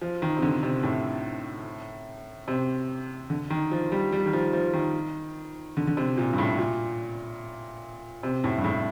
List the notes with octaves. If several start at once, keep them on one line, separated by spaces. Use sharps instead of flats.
F3
D#3
C3
D3
C3
A2
C3
D3
D#3
F3
G3
G3
D#3
F3
F3
D#3
D3
D3
C3
A#2
G2
A2
A#2
C3
A2
G2
A2